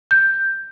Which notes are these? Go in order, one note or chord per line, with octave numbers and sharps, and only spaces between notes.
G6